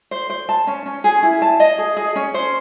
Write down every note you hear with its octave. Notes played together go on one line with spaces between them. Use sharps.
C5
C5
A5
C#4
C#4
G#4
E4
A5
D#5
G#4
G#4
C#4
C5